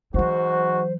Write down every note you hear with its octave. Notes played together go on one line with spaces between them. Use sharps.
G#2 E3 F#3 F#4 C5